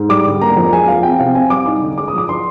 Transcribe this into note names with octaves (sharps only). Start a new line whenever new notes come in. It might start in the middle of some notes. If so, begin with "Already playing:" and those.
Already playing: G#2
G3 D6
D3
A#3 A#5
F2
G#3 G#5
F3 F5
C4 G5
C3 F5
C4 G#5
G3 D6
D#4 D6
D3
G#3 D6
D#6
F3 D6
D4 C6